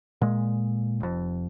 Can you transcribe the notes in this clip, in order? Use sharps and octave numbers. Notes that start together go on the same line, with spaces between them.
A#2 G#3
F1 F2